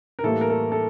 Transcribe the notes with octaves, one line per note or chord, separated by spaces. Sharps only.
A#4
A2 E3 G3 A#3 A4
A#4
A4
A4